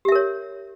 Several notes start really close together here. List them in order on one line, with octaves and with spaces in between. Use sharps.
G4 E5 A#4 C#5